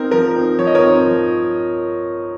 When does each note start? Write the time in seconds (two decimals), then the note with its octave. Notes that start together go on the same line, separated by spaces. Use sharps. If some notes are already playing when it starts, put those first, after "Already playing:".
Already playing: C4 D#4 A#4
0.11 F3 A#4
0.36 C4 D#4
0.59 F3 C#5
0.67 D#5
0.75 A#4 C#5
0.82 C4 D#4
1.06 F3